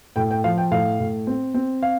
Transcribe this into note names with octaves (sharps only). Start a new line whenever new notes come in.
A2 G5
G5
F3 F5
G5
A2 F5
A2
C4
C4
F5